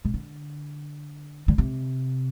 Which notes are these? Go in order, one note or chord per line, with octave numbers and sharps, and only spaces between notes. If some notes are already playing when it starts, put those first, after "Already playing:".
C3
D3
D3
C3